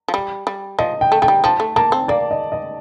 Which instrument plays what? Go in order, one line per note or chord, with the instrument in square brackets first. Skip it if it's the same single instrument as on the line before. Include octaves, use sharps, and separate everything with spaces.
[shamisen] F3
G3
G3
[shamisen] F3 [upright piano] D#5
[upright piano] G5
[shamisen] A3
[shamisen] A3 [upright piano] G5
[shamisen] G3
[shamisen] F3 [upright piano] A5
[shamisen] A3
[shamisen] A#3 [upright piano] A5
[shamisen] C4
[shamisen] A#3 [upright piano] D5
[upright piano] D#5
D#5